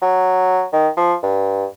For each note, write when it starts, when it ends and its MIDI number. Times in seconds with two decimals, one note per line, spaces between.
0.02 0.65 54
0.73 0.88 51
0.97 1.14 53
1.23 1.65 43